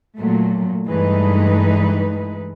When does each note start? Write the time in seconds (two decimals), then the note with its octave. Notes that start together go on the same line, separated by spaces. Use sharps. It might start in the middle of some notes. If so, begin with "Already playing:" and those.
0.17 A#2 F#3 A3
0.86 G2 E3 G#3 A3 D#4 B4